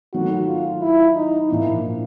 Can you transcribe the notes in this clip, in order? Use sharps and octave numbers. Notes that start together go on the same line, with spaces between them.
D#3 F#3 A3 F#4
F4
E4
D#4
A#2 F3 A#3 D4 E4